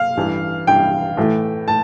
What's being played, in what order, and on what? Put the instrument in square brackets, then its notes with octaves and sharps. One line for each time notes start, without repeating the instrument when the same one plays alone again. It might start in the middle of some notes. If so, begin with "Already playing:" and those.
Already playing: [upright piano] F5
[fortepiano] A1 G2 E3
[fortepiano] A1 G2 E3 [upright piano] G5
[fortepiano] A2 E3 A3
[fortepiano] A2 [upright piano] A5